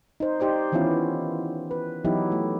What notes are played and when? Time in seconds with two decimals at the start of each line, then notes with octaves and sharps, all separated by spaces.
0.20 D#4 C5
0.40 D#4 G4 C5 D5
0.72 D#3 E3 B3 C#4 E4 F4
1.71 B4
2.05 E3 F#3 B3 D#4 E4 G4
2.32 A3